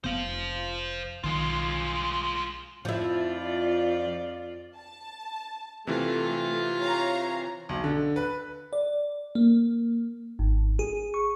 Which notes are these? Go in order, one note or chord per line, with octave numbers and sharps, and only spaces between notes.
F1 B3 C5 F5
B1 D#3 G#3 F4
F2 F3 E4 F4 D5
A5
C3 E3 A3 F4
C#5 F5 A#5
B1
D3
B4
D5
A#3
G#1
G#4
C#6